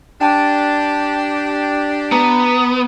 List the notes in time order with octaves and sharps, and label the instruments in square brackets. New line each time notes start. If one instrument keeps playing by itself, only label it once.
[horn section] D4 G4 [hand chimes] G5 A5
[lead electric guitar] B3 [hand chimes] A#5